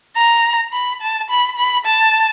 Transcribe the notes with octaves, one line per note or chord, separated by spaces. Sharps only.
A#5
B5
A5
B5
B5
A5